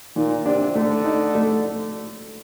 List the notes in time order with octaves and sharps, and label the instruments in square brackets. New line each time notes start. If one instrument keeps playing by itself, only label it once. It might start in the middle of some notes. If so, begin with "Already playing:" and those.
[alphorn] A#2 [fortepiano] D#3
[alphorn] C3 [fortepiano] D4
[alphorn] D3 [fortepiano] A3
[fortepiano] D#4
A3